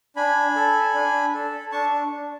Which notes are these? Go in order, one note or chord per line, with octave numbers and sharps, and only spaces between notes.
D4 G#5 B5
A4
D4
A4
D4 A5 C#6